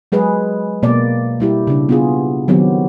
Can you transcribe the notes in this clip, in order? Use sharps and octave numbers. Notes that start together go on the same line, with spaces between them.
F#3 G#3 G#4 B4
B2 A#3 D5
G3 E4 G4
C#3 D4
B3 F4 G#4
D#3 F#3 B3 C4 G4